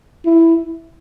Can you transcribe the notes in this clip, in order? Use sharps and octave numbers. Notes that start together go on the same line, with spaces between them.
E4